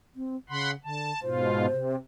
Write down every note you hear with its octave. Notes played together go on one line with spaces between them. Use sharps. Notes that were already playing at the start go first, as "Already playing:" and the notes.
C4
C#3 F#5 B5 C6
D3 A5
G#2 B2 F4 C5
C3